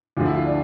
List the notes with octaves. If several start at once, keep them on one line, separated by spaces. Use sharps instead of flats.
D2 D3 F3 F4
E4
F4
D4